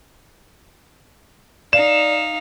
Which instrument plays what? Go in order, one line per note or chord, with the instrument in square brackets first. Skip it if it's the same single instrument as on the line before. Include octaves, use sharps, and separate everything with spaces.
[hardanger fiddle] D#4 F5 [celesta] D5 [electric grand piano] E7